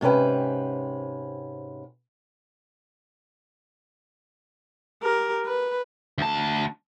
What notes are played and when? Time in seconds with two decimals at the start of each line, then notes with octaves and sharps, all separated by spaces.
0.01 G#2 C3 C#4 B4 G5
5.03 G4 A#4
5.45 B4
6.18 D2 A5